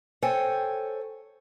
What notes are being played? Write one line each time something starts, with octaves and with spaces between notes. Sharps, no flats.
A4 C5 C#5 G5 G#5